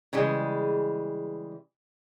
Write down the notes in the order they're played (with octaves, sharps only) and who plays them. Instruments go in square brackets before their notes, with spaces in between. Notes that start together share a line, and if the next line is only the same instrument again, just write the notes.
[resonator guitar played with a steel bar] C#3 E3 G3 G#3